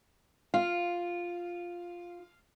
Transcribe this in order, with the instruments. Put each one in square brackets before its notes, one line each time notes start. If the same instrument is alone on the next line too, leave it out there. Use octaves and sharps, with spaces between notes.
[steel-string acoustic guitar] F4 [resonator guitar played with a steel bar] F5